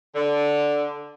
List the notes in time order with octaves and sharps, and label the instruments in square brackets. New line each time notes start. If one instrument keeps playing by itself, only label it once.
[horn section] D3